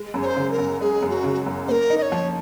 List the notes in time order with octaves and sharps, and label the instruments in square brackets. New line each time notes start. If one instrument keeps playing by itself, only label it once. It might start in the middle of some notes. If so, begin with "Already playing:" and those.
Already playing: [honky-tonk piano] G#3
F#2
[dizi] C#5
C5
[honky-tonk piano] C#3
[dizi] A#4
[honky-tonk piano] F#2
[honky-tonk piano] G#3 [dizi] G#4
[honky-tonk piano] F#2
[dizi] F#4
[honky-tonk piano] C#3
F#2
[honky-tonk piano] A#3 [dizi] A#4 C5
[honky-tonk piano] D#4
[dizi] D#5
C#5
[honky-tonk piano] F3